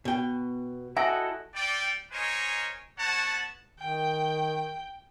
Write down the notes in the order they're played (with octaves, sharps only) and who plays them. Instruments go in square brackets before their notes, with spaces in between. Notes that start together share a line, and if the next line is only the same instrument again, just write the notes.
[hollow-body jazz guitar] B2 G5
[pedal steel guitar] E4 A4 D#5 [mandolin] F#4 [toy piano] E5 G#5
[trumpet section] G3 D5 G5
D#4 A#4 C5 C#5 D#5 G#5
B3 F#4 C#5 F#5 A5
[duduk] D#3 [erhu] G5